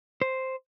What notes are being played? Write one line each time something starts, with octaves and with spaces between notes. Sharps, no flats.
C5